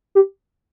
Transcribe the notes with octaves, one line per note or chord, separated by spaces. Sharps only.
G4